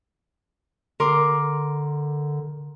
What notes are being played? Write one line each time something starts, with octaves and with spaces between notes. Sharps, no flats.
D3 A#4 C6 D6